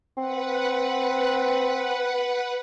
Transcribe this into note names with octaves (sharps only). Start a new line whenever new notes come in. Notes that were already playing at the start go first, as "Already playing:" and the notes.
C4 B4 F#5